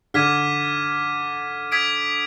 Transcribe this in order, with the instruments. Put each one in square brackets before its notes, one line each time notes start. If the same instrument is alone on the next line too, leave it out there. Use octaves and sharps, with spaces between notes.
[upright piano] D3 [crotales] D6 F6 G#6 B6 D#7
[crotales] D#6 G#6 B6 D7